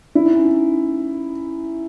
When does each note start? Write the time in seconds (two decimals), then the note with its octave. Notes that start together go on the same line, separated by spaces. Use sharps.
0.15 E4
0.25 D#4
0.35 C#4
0.45 D#4